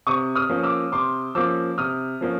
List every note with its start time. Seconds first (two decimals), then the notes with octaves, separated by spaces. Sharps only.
0.07 C3 C#6 D#6
0.35 D#6 F6
0.49 F3 A#3 C#4
0.63 D6 E6
0.92 C3 C6 D6
1.35 F3 A#3 C#4 D6 E6
1.78 C3 D#6 F6
2.21 F3 A#3 C#4